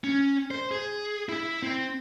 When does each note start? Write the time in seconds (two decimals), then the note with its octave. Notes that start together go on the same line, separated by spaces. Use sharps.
0.04 C#4
0.51 C5
0.71 G#4
1.29 E4
1.62 C4